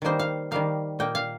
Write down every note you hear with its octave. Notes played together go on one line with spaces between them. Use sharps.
D#3 G3 A#3 D#4 C5
F5
D#3 G3 A#3 D#4 F5
A#2 A#3 D#4 G5
F5